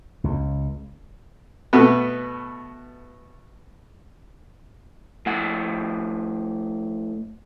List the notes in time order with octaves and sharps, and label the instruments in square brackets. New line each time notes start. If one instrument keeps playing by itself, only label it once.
[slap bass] C#2
[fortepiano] B2 A3 B3 B4
[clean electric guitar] A2 F3 F#5